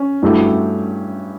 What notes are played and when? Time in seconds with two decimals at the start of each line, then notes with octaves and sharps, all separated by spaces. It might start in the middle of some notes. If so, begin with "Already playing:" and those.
Already playing: C#4
0.22 G2 F#3 A3 E4 G4